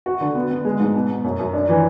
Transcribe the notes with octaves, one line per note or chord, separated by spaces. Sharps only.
F#4
D3
B3
B3
G#3
G#2
B2
B2
F#2
F#2
D4
E3